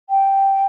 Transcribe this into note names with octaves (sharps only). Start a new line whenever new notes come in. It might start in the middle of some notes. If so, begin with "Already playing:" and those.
G5